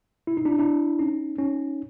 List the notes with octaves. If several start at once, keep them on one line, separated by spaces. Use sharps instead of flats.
E4
D#4
D4 E4
D4 E4
C#4 D#4
C#4 D#4